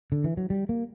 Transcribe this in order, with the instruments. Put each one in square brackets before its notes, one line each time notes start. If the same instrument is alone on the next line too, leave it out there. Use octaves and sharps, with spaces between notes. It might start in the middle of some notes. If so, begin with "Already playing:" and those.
[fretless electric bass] D3
E3
F#3
G3
A#3